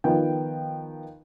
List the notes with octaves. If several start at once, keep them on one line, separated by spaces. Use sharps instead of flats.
D#3 F3 B3 G5